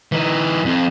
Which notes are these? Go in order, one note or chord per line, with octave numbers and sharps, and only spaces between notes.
E3 D#4
F2